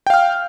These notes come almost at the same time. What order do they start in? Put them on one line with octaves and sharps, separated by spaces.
G5 F5 F6